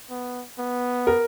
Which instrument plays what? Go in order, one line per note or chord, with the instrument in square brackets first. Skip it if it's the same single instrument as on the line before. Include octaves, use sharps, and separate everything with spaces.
[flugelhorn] B3
B3
[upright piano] A#4